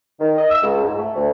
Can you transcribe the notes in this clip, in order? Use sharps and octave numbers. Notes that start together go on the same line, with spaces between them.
D#3
D#5
E6
C#2
G#2
A3
D2